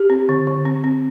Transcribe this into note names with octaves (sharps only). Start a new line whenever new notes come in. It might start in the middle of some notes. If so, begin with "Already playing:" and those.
Already playing: G4
C4
D3
D3
C4
C4